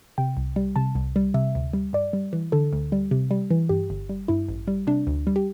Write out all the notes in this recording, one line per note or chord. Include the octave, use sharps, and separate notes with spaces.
C3 G5
C2
G3
C3 A5
C2
G3
C3 E5
D2
G3
G2 D5
G3
E3
D3 A4
D2
G3
C3
G3
E3
G2 G4
G1
G3
G2 E4
A1
G3
C3 D4
D2
G3
G4